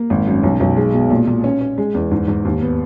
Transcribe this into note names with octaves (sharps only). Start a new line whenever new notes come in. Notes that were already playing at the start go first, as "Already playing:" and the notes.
Already playing: A#3
G#1
F#2
B1
B1
G#3
B2
A#2
A#2
C#4
C#4
G#3
E2
G#2
G#2
D#2
B3